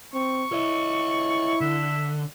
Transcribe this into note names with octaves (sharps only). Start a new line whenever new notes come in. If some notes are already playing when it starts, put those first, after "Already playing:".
C4 C#6
E4 C#5 D#5
D3 E5